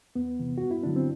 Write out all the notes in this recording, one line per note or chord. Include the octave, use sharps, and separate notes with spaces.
E2 B3
C3 E3
G2 F#4
E4
D3 F#3 D4
C4